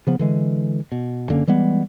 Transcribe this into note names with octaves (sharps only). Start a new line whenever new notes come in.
C#3 F3 B3
D3 E3 G#3
B2
F#1 D3 A#3 C#4
E3 G3 G#3 B3